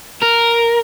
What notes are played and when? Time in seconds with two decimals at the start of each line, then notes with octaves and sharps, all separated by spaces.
0.22 A#4